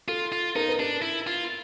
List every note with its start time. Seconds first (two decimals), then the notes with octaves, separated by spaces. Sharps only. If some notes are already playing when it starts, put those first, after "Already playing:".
0.08 F4 A4
0.32 F4
0.56 D#4 A#4
0.68 B4
0.79 D4 A#4
1.02 E4
1.27 F4